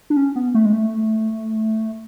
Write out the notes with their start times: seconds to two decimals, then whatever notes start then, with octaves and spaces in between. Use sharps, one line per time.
0.10 D4
0.17 C#4
0.36 B3
0.54 A3
0.66 G#3
0.73 A3